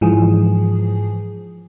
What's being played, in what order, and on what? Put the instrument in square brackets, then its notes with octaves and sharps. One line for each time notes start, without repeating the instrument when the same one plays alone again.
[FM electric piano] G#2 E3 F3 G#4